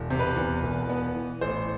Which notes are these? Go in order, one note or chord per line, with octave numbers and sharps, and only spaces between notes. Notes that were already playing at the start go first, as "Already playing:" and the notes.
Already playing: E1
C3
B4
E2
E1
B3
E3
A1 C5